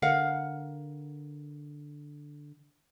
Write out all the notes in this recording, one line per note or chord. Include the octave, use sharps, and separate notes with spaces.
D3 A#4 F5 F#5